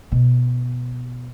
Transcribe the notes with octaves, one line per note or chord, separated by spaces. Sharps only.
B2